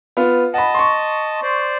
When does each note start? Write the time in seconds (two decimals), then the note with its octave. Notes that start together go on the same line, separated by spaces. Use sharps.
0.17 B3 F4
0.54 D#5 F#5 A5 B5
0.75 C6 C#6
1.43 C5 D5